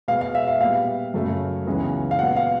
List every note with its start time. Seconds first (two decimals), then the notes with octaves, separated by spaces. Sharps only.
0.08 B2 G#3 B3 F5
0.21 F5
0.35 E5
0.48 F5
0.60 A#2 G3 B3 F5
1.14 F#2 C#3 F#3 A3
1.66 C#2 C#3 E3 G#3 B3
2.11 F5
2.19 A#2 F#3 B3 F#5
2.36 F5